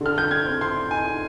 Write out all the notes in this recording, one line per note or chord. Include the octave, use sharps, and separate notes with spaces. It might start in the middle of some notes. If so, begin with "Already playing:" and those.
D3
F6
G6
G#6
C4
C6
D#4 G#5